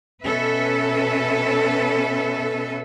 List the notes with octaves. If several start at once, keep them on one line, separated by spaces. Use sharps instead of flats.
B2 C#4 A4 B4 E5